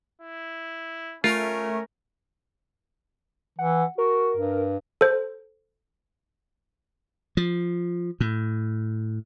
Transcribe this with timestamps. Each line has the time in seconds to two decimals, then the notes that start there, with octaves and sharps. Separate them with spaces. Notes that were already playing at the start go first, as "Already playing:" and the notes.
0.21 E4
1.24 A3 C#4 F4 A#4
3.59 E3 F#5
3.98 F#4 A#4
4.37 G2
5.01 A4 C5
7.37 F3
8.20 A2